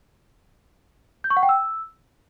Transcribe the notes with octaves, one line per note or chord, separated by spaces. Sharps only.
G6
C#6
F#5
G5
E6